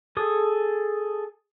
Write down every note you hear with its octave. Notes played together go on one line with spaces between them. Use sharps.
G#4 A4 D#6